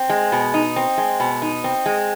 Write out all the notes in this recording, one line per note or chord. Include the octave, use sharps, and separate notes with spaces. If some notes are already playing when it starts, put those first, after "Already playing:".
Already playing: C4
G#3
B2
D#4
C4
G#3
B2
D#4
C4
G#3